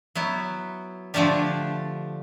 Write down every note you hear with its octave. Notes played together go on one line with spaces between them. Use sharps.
F#3 B3 E4
D3 F3 A3 D4 G4